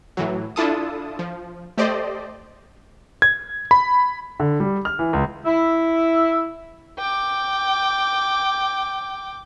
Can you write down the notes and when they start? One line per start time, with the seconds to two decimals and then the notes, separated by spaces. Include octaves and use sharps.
0.17 A2 E3 F#3
0.56 D4 E4 F4 A4 A5 D#6
1.19 F3
1.78 A3 G4 C5 D5 D#5
3.22 G#6
3.71 B5
4.40 D3
4.60 G3
4.85 F6
4.99 E3
5.13 C#2
5.45 E4
6.99 G5 D6